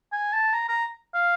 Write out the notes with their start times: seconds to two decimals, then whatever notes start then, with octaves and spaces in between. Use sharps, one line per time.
0.13 G#5
0.33 A5
0.53 A#5
0.69 A#5
1.14 F5